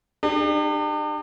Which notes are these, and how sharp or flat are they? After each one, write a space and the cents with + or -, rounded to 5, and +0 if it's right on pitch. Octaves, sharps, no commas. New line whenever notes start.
D4 +45 G4 +30